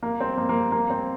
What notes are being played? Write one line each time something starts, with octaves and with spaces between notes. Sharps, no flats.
A#3
C4
A#3
A#3
A#3
C4